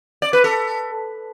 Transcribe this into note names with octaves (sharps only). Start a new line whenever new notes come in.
D5
B4
A4